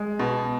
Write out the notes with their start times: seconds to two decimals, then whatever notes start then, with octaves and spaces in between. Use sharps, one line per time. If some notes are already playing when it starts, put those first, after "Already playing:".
Already playing: G#3
0.19 B2